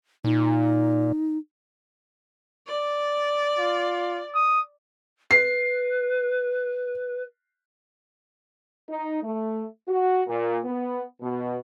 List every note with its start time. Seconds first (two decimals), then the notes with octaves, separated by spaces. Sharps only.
0.24 A#2 D#4
2.67 D5
3.59 F4
4.34 D#6
5.31 B4 C7
8.89 D#4
9.22 A3
9.88 F#4
10.27 A#2
10.63 B3
11.21 B2